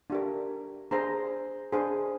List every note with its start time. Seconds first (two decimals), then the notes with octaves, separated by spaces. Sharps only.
0.10 D4 G4 A#4
0.91 D4 G#4 C5 A#5
1.72 D4 G#4 C5